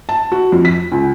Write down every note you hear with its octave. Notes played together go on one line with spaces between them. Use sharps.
A5
F#4
F2
B6
C#2